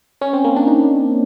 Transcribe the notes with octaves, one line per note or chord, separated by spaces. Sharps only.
C#4
C4
A#3
D4
D#4